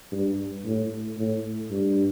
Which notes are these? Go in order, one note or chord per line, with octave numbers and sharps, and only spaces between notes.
G2
A2
A2
G2